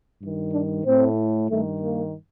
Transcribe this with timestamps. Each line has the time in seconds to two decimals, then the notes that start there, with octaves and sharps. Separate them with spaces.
0.20 G2 D#3
0.52 D4
0.85 A2 C4
1.50 G2 D#3 A3
1.82 A#3